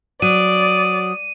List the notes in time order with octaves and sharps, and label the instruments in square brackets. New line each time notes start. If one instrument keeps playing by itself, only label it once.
[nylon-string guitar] F#3 [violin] D5 [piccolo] D#6 [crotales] D#7